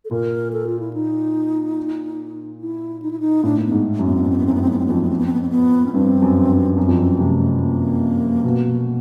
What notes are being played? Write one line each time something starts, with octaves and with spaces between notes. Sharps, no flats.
A4
A#2 A#4
A4
F4
E4
D#4
E4
D#4
E4
D#4
A2 D4
A#3
B3
G#2
F#2
B3
C4
B3
C4
B3
F#2 C4
B3
C4
F#2 B3
C4
B3
F2 C4
B3
C4
B3
C4
B3
C4
B3
C#4
G2 C4
F#2
F#2
F#2 C4
F2
F#2
C3 A3
A#3
B2